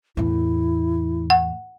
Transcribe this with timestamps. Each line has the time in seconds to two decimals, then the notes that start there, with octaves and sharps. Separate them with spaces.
0.17 E2 A2 E4
1.30 F#5